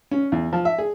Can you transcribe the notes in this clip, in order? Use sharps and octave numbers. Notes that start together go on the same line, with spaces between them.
C#4
E2
F3
E5
G#4